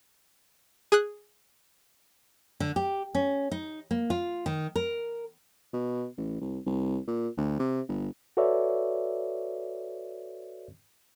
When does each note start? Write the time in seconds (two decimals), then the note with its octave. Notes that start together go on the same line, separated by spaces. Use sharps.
0.92 G#4 D#6 F#6
2.60 D3
2.76 G4
3.15 C#4
3.51 D#4
3.91 A#3
4.10 F4
4.46 D#3
4.76 A#4
5.73 B2
6.17 A1
6.41 C2
6.66 C2
7.07 A#2
7.37 D2
7.59 C3
7.88 G1
8.37 F#4 A4 B4 C#5 D5 E5